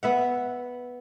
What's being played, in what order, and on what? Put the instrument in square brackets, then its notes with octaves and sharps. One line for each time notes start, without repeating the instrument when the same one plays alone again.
[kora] B3 E5 F#5